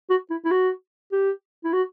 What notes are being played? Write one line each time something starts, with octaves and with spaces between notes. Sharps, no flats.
F#4
E4
E4
F#4
G4
E4
F#4